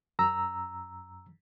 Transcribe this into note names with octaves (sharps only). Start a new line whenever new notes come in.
F#2 A#5 E6